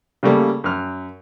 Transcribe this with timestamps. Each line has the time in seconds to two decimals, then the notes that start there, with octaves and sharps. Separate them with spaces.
0.23 C#3 G3 A3 A#3
0.64 F#2 F6